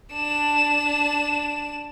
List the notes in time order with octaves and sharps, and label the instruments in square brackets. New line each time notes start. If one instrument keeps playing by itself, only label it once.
[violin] D4 E7